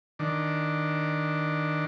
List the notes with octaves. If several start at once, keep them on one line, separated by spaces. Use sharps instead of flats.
D#3 D4